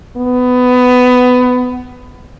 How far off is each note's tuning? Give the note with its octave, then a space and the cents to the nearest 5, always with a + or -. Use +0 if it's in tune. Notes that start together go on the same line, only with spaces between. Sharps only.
B3 +20